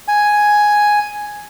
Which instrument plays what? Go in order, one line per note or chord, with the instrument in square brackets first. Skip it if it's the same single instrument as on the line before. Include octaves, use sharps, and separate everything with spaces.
[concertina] G#5